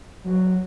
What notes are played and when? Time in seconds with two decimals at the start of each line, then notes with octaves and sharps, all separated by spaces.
0.24 F#3